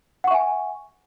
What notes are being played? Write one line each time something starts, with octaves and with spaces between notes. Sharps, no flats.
E5 F#5 G#5 C#6